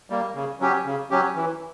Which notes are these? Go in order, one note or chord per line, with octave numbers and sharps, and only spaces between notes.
G3 A#3
C#3
F#3 C#4 G4
C#3
F#3 C#4 G4
E3